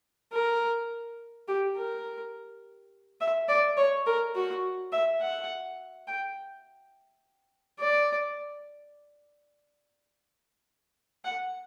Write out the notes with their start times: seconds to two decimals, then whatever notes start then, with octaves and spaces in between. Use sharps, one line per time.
0.33 A#4
1.48 G4
1.76 A#4
3.20 E5
3.49 D5
3.77 C#5
4.07 A#4
4.35 F#4
4.92 E5
5.21 F#5
6.07 G5
7.79 D5
11.24 F#5